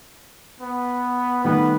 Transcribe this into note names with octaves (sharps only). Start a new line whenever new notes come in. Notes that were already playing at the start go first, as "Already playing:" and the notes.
B3
D#3 G3 A3 B3